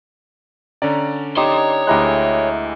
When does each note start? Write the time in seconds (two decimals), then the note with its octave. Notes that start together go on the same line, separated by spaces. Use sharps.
0.82 D3 C#4 D5 A#5
1.37 D#4 G4 C#5 C6
1.87 D2 G#3 E4 G4 A#5 F#6